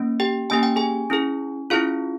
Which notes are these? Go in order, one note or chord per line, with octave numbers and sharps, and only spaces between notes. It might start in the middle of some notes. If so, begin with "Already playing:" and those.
Already playing: A#3 C#4
G4 G5
A#3 C#4 G4 G#5
G5
G#4 G#5
C#4 E4 G#4
C#4 E4 F4 G#4 F5